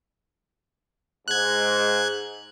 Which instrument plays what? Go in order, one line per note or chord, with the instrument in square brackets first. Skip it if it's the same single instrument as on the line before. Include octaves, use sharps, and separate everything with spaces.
[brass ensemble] G#2 [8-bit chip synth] F#6 G#6